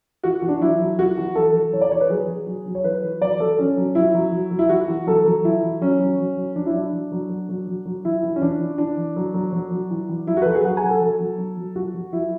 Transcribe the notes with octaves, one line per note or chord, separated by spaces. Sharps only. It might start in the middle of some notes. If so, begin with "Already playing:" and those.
E3 F#4
E3
D4
F#3 E4
F#3
E3 F#4
E3
F#3 A4
F#3
E3 C#5
D5
E3 C#5
B4
F#3 G#4
F#3
F#3
F#3
C#5
E3 B4
E3
F#3 D5
F#3 A4
F#3 C#4
F#3
F#3 E4
F#3
F#3
F#3
E4
E3 F#4
E3
F#3 A4
F#3
E3 E4
E3
F#3 C#4
F#3
F#3
F#3
F#3 D4
E4
F#3 D4
F#3
F#3
F#3
F#3
F#3
F#3
E3 E4
E3
C#4
E3 D4
E3
E3 D4
E3
F#3
F#3
F#3
F#3
E3
E3
F#3 E4
F#4
B4
F#3 A4
G#4
F#3 F#5
G#5
F#3
A4
F#3
F#3
F#3
F#3
F#3 F#4
F#3
F#3 E4